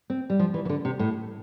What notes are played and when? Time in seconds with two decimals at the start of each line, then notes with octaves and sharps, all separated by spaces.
0.10 C4
0.30 G3
0.39 F3
0.54 E3
0.65 E3
0.69 D3
0.85 C3
0.99 A2